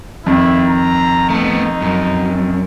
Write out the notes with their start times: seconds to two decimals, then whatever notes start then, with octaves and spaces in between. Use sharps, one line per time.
0.26 F2 D#3 E4
0.67 A#5
1.30 A3 B3 D#4
1.82 F#2